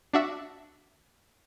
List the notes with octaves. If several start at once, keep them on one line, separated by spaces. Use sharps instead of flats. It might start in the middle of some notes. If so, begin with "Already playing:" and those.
D4 F#4 E5